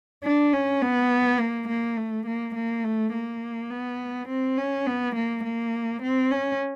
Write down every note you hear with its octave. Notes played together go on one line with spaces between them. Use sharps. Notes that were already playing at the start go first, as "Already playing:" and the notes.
D4
C#4
B3
A#3
A#3
A3
A#3
A#3
A3
A#3
B3
C4
C#4
B3
A#3
A#3
C4
C#4